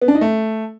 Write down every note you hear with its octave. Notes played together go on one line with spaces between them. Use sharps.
B3
D4
D#4
A3